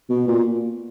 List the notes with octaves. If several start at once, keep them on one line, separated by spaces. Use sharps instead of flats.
B2
A#2